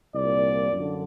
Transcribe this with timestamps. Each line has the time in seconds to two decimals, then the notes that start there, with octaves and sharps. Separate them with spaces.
0.14 C2 A#2 D5
0.71 F#2 D3